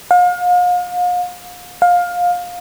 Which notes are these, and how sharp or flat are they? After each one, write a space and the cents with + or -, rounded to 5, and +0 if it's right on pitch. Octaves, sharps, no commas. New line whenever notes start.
F5 +40
F5 +20